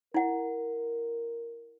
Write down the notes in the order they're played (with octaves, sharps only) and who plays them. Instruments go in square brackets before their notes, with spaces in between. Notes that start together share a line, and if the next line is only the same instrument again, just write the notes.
[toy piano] E4 F#5 [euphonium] A#4